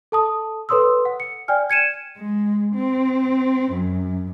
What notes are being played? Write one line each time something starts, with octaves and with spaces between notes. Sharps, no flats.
A4 A5 D#6
A4 B4 C#5 C6 D#6 E6
F#5
C#7
D5 G5 G#5 F6
G#6 C#7 D#7 E7
G#3
C4
F#2